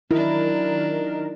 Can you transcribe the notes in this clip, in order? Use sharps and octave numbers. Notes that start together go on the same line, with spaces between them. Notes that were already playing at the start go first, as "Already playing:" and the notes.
D#3 F#3 D4 E4 A#4